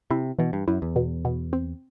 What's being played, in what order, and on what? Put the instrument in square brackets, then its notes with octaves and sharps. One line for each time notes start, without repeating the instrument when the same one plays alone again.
[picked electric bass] C3 [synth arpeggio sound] E4
[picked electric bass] B2 [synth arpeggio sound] E3
[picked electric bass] G2
[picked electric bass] F#2 [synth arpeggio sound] E4
[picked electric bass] E2
[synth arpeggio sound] B2
B2
C4